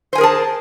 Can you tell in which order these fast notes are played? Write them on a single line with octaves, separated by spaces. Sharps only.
C5 G#5 A#4 G#4 A5